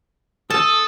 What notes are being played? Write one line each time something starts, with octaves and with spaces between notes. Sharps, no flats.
A4 A5 D#6